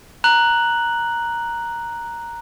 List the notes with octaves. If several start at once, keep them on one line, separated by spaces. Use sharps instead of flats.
A#5 F#6 F#7